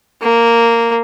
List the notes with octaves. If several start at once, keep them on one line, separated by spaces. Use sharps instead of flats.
A#3